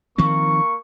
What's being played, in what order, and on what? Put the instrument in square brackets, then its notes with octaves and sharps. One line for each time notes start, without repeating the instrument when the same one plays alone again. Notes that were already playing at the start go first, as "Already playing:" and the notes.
[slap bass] D#3 F3 C4 [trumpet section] A#3 C#6